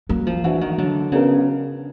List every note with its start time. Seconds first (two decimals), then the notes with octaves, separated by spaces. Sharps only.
0.09 F#3 A#3
0.27 F3
0.44 E3 D4 F#4
0.61 D#3
0.77 D3 F#3
1.12 C#3 B3 D4 F#4 A#4